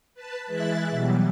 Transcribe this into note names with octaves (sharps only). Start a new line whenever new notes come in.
B4 A5
E3 G#3 E4 E5 F#6 A6
B2 E3 F#3 G3